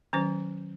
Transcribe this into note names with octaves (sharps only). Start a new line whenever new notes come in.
D#3 F#3 C#4 C5